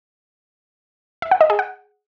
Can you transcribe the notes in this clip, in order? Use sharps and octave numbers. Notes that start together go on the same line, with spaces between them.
E5
F#5
D#5
G#4
F#5